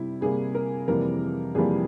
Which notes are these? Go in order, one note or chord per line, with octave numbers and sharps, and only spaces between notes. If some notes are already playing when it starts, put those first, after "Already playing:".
Already playing: C3 G3 E4
C3 G3 A#3 G#4
A#4
F2 C3 E3 G3 A#3 A#4
F2 C3 E3 G3 A#3 G#4